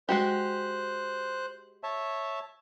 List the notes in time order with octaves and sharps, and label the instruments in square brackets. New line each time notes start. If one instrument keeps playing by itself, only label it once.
[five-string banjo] G#3 F#4 G4 [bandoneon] C5 F#6
[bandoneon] C#5 E5 A5